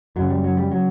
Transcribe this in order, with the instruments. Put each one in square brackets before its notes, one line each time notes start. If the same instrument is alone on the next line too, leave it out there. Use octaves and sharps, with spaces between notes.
[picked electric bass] F#2 C#3 F#3
G3
F#3
G3
F#3